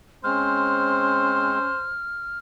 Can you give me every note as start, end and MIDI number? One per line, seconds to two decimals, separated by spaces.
0.24 1.59 56
0.24 1.59 60
0.24 1.73 61
0.24 1.91 72
0.24 2.39 89